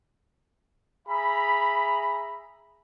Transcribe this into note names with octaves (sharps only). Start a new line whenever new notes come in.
G#4 E5 A#5 B5